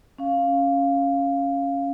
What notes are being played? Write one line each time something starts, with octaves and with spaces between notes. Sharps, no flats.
C#4 F5